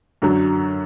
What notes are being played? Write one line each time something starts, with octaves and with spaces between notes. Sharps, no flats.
F#2 D3 F#3